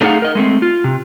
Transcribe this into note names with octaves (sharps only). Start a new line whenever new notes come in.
A3 D4 D#4 G#4 F5 F#5
A#4 D#5
G#3 A3 C4
F4
C3